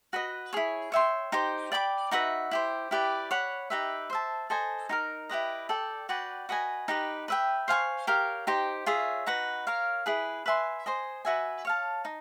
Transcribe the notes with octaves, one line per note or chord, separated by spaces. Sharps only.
F#4 B4 D#5
E4 G#4 C#5
C#5 E5 G5 C6
D#4 G4 C5
D5 G5 B5 D6
D#4 F#4 B4 E5
E4 G4 C5
E4 G4 B4 D5
C#5 F#5 B5
D#4 G4 B4 E5
C5 E5 A5
A4 C5 D#5 G#5
D#4 G4 A#4
E4 G4 B4 D#5
A4 D5 G5
F#4 B4 D5 G5
F#4 B4 D#5 G#5
D#4 G4 B4
B4 E5 G5
C5 F5 G#5 C#6
G4 A#4 C#5 F5
D#4 G4 C5
F4 G#4 C#5 E5
D#4 F#4 B4
A#4 C#5 F5
E4 G#4 B4
B4 E5 G#5 C6
C5 D#5 G#5
F#4 B4 E5 G#5
C#5 F5 A5
D#4